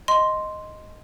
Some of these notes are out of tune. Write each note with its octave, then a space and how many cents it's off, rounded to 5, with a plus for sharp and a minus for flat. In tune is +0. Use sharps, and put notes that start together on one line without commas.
D#5 +0 C6 +0